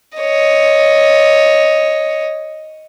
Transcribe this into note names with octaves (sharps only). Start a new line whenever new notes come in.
C#5 D#5